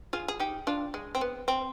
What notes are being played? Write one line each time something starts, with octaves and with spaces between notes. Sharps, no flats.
F4 G#4
G#4
D#4 G4
D4 F4
G#3
C4
B3
C4